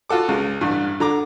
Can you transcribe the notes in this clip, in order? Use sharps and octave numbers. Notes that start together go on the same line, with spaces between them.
F4 F#4 A4 D6
C#2 G#3
A1 G2
D3 A#5 D6